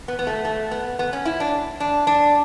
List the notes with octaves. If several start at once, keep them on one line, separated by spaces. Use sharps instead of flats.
B3
B3
A3
A3
B3
B3
C#4
E4
D4
D4
D4